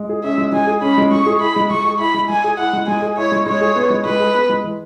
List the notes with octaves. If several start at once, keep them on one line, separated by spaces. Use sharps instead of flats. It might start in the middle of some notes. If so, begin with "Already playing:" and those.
Already playing: G#3
G#4
C#4 E5
G#3
G#3 G#5
G#4
C#4 B5
G#3
G#3 C#6
G#4
E4 B5
G#3
G#3 C#6
G#4
E4 B5
G#3
G#3 G#5
G#4
E4 F#5
G#3
G#3 G#5
G#4
E4 C#5
G#3
G#3 C#5
G#4
B3
G#3
G#3 B4
G#4
B3
G#3
E3